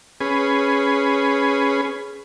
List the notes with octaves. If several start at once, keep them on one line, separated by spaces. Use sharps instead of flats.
C#4 G#4 B4